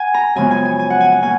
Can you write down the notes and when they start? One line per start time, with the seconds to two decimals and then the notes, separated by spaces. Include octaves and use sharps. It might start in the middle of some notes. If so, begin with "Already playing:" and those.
Already playing: F#5 G#5
0.14 A#5
0.35 F#2 C#3 F3 G#3 B3 G#5
0.51 G#5
0.65 G#5
0.79 G#5
0.90 F#5
1.00 G#5
1.12 F#5
1.22 B2 A#3 G#5